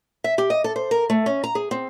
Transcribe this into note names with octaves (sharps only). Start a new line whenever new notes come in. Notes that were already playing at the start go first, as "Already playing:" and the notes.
E5
G4
D#5
A4
C5
A#4
A3
C#4
A#5
G#4
C4